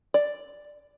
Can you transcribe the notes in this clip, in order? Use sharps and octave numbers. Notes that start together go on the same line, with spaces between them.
D5